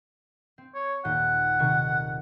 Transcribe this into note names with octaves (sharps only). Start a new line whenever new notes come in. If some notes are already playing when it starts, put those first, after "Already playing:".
C4
C#5
D#1 F#5 G6
C3 D#3 C#6